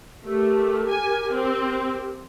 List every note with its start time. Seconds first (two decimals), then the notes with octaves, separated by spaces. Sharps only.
0.24 A3 G4 A#4
0.88 G#5
1.31 C4